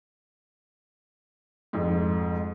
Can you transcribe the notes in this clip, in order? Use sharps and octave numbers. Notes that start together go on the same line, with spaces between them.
F2 G#2